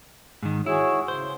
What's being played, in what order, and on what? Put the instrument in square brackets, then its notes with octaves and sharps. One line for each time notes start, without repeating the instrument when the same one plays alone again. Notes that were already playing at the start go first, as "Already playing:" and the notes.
[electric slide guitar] G#2 D#3
[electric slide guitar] E4 [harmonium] F#4 G#4 C#5
[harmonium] C#3 [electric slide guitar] C5